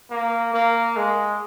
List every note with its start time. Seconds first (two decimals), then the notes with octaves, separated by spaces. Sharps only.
0.10 A#3
0.54 A#3
0.97 G#3